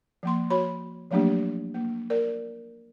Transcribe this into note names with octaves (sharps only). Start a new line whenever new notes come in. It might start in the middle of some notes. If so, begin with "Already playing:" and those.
F3 A#3 C6
F#4 C#5 B5
F3 F#3 A3 A#3 D4 G4
A#3
A#4 D5